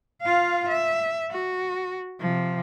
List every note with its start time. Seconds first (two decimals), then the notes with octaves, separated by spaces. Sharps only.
0.22 F4 F5
0.69 E5
1.31 F#4
2.20 C3 F3